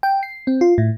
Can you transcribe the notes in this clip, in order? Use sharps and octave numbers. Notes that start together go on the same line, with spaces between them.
G5
C7
C4
F4
A2